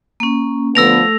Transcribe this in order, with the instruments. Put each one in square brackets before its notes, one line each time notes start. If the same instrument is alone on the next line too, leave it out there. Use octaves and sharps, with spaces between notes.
[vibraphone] A#3 C#4
[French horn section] D3 F3 B3 [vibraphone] A3 A4 [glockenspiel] E6 A#6 F7